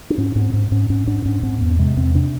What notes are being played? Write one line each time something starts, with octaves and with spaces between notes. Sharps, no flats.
D4
G#2 C#4
G#2 C4
G#2
G#2 C#4
G#2 C#4
G#2 D4
G#2 C#4
G#2 C4
E2 B3
C3 G#3
E2 C4
C3 D4